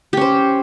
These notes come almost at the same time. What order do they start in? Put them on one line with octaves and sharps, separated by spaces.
G4 C#4 C5